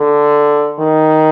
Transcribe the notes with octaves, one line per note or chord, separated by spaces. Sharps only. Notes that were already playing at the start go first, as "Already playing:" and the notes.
Already playing: D3
D#3